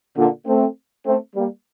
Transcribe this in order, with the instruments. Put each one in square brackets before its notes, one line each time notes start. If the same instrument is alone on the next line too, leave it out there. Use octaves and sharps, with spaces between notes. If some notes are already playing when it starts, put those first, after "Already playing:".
[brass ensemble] A#2 D3
A3 C4
A3 C4
G3 A#3